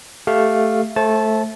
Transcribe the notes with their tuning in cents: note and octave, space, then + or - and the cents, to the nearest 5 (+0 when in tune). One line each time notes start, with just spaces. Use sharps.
A3 +0 G4 +0 F5 +0
A3 -5 C5 +30 A5 -15